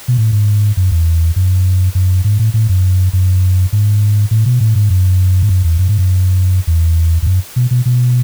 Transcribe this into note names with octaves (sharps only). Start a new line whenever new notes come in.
B2
A2
G#2
F#2
E2
F#2
F#2
G#2
A2
A2
F#2
F#2
G#2
A2
B2
A2
G#2
F#2
G#2
F#2
E2
F#2
G#2
F#2
E2
E2
F#2
B2
B2
B2